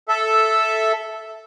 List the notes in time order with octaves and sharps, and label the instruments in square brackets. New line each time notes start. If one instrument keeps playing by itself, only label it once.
[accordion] A4 E5